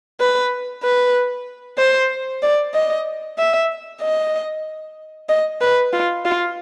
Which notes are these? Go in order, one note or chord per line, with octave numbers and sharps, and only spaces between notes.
B4
B4
C5
D5
D#5
E5
D#5
D#5
B4
F4
F4